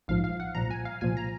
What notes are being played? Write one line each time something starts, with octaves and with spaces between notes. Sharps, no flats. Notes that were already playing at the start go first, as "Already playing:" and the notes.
A#1 G#2 F3 F5
F5
F#5
C2 A#2 F3 A#5
G#5
F5
C2 A#2 F3 G#5
A#5